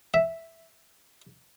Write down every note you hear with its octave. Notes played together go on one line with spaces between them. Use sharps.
E5